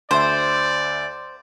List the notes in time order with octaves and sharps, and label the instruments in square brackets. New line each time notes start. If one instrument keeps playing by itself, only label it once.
[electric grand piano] D2 E5 [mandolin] C5 [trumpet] D5